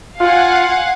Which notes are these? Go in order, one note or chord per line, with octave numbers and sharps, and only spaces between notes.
F4 F5 F#5 G#5